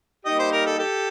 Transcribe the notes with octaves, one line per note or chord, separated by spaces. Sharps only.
G3 A#3 D#4 G4 D#5
C5
A#4
A4
G4 A4